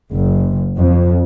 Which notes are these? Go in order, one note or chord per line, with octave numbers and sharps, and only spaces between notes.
F#1
F2